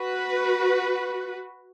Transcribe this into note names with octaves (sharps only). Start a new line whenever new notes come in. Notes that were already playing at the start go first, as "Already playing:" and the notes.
Already playing: F#4 B4